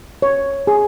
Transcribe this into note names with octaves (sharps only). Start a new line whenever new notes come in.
C#5
G#4